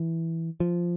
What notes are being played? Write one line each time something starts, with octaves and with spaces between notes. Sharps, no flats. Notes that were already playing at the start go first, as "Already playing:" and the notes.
Already playing: E3
F3